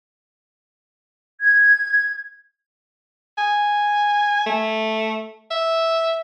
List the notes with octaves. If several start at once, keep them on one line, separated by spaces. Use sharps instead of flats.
G#6
G#5
A3
E5